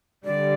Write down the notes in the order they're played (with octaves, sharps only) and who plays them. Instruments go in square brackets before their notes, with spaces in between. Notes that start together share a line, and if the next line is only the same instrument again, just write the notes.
[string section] D3 G3 [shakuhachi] D5